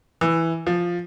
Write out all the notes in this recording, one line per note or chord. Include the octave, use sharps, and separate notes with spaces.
E3
F3